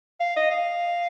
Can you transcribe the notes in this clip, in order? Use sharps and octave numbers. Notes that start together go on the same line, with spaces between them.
F5
D#5
F5